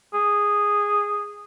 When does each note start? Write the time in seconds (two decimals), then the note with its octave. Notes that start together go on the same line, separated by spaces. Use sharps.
0.14 G#4